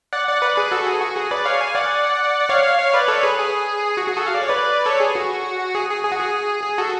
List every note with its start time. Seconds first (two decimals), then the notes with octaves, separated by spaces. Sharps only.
0.13 D5 F#5
0.27 D5 F#5
0.42 B4 D5
0.56 G#4 B4
0.71 F#4 A4
0.87 G#4
1.01 F#4
1.16 G#4
1.31 B4 D5
1.45 C#5 F5
1.60 F5 G#5
1.75 D5 F#5
2.49 C#5 F5
2.63 C#5 F5
2.79 C#5 F5
2.93 B4 D5
3.08 A4 C#5
3.23 G#4 B4
3.38 G#4
3.97 F#4
4.07 G#4
4.17 F#4 A4
4.27 F5
4.34 D5
4.42 C#5
4.49 B4 D5
4.86 A4 C#5
5.00 G#4
5.15 F#4
5.75 G#4
5.89 G#4
6.04 G#4
6.12 F#4
6.19 G#4
6.64 G#4
6.78 F#4 A4